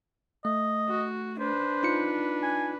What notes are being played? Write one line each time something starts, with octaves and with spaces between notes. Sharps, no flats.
A3 D#5
F#4
D4 B4 C5
D#4 F4 C#7
G#5